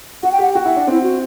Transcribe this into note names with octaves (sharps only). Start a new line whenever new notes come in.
F#4 F#5
G5
G4 F#5
F#4 G5
E4 F#5
D4
C4 E4
F#4